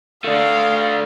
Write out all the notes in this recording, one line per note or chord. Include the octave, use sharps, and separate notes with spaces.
A3 D4 F5